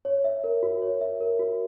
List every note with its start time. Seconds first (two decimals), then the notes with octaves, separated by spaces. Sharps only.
0.05 C#5
0.24 E5
0.44 A#4
0.63 F#4
0.82 C#5
1.01 E5
1.20 A#4
1.39 F#4